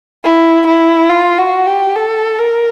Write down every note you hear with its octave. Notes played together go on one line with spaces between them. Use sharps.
E4
E4
F4
F#4
G4
A4
A#4